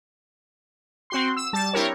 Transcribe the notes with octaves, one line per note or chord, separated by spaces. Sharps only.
C4 F#4 C6
E6
G3 A5
C4 D4 E4 G4 A#4 C#5